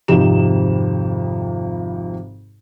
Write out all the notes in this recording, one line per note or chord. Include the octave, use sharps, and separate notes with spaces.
G#1 F2 C3 D#4 G4 E7